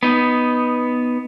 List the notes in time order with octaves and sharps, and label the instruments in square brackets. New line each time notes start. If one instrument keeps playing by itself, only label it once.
[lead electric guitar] B3 D#4